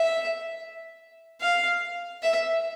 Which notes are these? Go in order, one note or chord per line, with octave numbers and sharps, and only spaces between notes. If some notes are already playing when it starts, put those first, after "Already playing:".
Already playing: E5
F5
E5